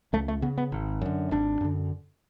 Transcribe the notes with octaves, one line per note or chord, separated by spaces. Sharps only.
C#2 A3
A3
C#3 B3
B3
G#1
F#2 D3
G#1 D4
F#2 D3